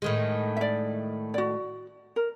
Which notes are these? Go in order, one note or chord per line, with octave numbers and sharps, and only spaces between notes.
A2 D#3 G#3
D5 E5
F#4 D5
A#4